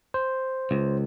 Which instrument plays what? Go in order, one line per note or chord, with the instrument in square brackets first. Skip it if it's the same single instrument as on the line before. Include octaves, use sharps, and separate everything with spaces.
[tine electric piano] C5
[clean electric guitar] C#2